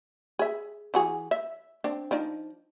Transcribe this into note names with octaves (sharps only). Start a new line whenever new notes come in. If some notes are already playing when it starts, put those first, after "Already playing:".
G#4 E5
E3 F#4 G#4
E5
C4 D4
F3 D4 D#4